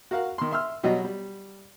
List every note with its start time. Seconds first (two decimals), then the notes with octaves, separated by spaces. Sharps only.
0.11 F#4 A#4 F5 F#5
0.38 D#3 C6
0.51 E5 C6 E6 F6
0.84 B2 F#3 G3 D#5
1.04 G3